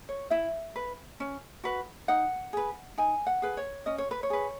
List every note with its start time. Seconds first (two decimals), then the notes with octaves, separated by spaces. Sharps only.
0.09 C#5
0.30 E4 E5
0.76 B4
1.20 C#4
1.64 F#4 B4
2.08 D#4 F#5
2.53 G#4 B4
2.98 D#4 G#5
3.27 F#5
3.42 G#4 B4
3.57 C#5
3.86 C#4 D#5
3.98 C#5
4.11 B4
4.23 C#5
4.30 G#4 B4